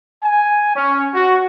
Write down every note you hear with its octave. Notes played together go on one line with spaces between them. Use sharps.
G#5
C#4
F#4